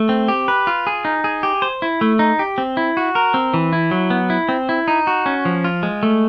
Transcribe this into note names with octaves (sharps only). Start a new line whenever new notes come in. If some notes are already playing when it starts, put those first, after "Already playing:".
Already playing: A3
C4
G4
B4
F4
G#4
D#4
G#4
G4
C5
E4
A3
D#4
G4
C4
E4
F#4
A#4
C4
E3
E4
F#3
B3
E4
C4
E4
D#4
F#4
C#4
F3
F4
G#3
A3